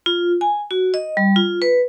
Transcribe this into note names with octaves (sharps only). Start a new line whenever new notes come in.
F4
G#5
F#4
D#5
G3
F4
B4